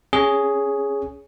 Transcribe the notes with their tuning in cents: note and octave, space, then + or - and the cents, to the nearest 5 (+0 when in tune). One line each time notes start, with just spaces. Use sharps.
C#4 +0 G#4 +0 C#5 +15